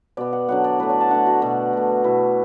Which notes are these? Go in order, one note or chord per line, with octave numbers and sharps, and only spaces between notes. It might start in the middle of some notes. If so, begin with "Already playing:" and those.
B2 B3 D5
F#5
D3 F#3 B3 F#5
D5
A2 A3 B4
D5
A5
D3 A3 F#5
F#4
B2 A3
B2 A3
B2 A3 E4